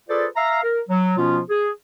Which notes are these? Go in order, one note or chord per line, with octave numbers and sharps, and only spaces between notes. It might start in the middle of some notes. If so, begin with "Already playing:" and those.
F4 G#4 A4 B4 C5 D5
E5 F5 A#5
A#4
F#3
B2 F3 B3 C#4 F4
G#4